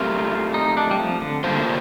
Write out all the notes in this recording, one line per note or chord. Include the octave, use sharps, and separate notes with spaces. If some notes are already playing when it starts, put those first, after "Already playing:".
Already playing: A3 C4 F4 G4 A#4
D#4
D4
G3
F3
D3
D3 G3 A#3 F4 C5